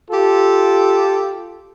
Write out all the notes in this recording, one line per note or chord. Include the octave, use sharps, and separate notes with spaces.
F4 G4 A4